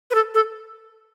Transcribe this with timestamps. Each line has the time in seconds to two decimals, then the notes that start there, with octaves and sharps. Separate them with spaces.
0.11 B4
0.15 A4
0.34 A4